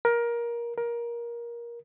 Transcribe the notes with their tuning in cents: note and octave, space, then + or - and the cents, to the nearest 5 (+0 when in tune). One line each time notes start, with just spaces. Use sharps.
A#4 +20
A#4 +20